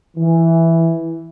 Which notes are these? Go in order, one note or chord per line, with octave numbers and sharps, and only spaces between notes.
E3